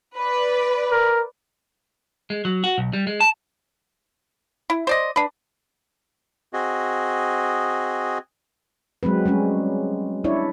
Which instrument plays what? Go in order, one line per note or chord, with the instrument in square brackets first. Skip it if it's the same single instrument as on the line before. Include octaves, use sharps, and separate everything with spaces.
[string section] B4 D5
[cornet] A#4
[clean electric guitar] G#3
F#3
F#4
B1
G3
G#3
A5
[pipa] E4
C5 D5 D#5
D4 B4
[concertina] C4 F#4 G#4 D#5
[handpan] F#3 G#3 C4 B4
G3 G#3 C#4
D4 E4 C#5 D5